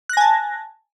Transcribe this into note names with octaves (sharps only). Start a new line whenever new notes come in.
G#5 A5 F#6 A#6